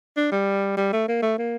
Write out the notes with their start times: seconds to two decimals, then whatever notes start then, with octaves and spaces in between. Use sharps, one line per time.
0.17 D4
0.32 G3
0.77 G3
0.93 A3
1.08 A#3
1.22 A3
1.38 A#3